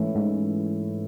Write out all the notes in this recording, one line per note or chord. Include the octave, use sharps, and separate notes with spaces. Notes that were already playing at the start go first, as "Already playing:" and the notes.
Already playing: G#2 E3 A3 C#4 E4
G#2